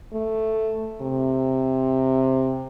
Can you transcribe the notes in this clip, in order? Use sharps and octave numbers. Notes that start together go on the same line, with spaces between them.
A3
C3